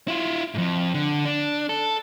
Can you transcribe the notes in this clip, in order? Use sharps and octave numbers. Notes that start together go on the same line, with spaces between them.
E4 F4
F2 G#2
D3
D4
A4